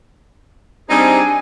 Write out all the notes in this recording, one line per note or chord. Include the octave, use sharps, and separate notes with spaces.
G3 C4 D4 D#4 G#4 G#5